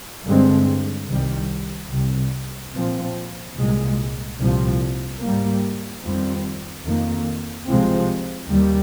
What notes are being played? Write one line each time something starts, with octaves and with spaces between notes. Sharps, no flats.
G2 D3 G#3 C4
C2 C3 D#3 G3
C2 C3 G3
A#2 F3 C4
C2 A#2 G#3
C2 A#2 F3
G#2 G3 A#3
F2 D#3 G3 C4
F2 D#3 A#3
C2 C3 F3 G#3 C4
D#2 D#3 G3